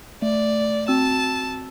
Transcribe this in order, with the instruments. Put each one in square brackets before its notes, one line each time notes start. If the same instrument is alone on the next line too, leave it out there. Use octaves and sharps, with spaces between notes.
[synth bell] A3 [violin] D5
[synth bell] C4 F#4 E6 [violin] A5